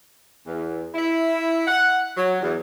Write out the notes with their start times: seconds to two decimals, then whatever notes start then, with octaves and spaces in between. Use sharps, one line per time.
0.47 E2
0.94 E4
1.67 F#5
2.17 F#3
2.41 E2